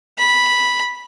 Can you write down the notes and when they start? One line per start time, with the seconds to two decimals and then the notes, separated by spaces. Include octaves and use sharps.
0.19 B5